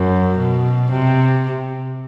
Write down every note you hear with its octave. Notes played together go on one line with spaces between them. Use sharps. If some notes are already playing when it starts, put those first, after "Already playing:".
Already playing: F#2
B2
C3